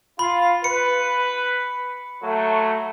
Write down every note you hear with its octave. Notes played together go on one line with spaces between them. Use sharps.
F4 B5
B4 C#7
F#3 A3